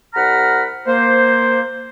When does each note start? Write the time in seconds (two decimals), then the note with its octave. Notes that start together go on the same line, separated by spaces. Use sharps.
0.14 C2 F#5 A#5 B5 F6
0.87 A#3 C5